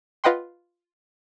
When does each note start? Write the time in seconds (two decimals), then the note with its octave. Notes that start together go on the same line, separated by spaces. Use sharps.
0.24 F4 B4 D#5 F#5 G5 C6